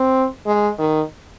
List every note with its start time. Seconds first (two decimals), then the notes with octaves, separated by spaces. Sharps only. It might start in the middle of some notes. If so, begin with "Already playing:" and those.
Already playing: C4
0.46 G#3
0.78 D#3